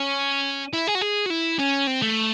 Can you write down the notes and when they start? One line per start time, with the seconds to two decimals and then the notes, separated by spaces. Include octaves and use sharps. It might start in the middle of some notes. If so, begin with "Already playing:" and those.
Already playing: C#4
0.73 E4
0.87 G#4
0.95 F#4
1.01 G#4
1.26 F#4
1.30 E4
1.59 C#4
1.87 C4
2.02 A3